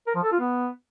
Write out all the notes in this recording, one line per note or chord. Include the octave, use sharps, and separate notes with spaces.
A#4
F3
A4
F4
B3